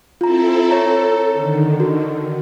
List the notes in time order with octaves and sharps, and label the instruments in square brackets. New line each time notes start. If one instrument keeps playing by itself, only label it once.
[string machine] C4 E4 A4 [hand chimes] F4 A#5
[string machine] A4 [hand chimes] C#5 A#5
[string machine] D3 D#3
[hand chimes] F#4